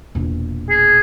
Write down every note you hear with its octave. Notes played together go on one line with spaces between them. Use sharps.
E1 A#2
G#4